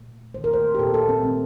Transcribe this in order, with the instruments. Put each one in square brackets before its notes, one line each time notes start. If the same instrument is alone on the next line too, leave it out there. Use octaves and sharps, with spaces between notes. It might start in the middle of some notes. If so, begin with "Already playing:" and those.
Already playing: [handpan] A#2 A3
D#3 A3 C5
A#4
C5
G4
A#2 A3 A4
A4
C4
D#3 A3 C4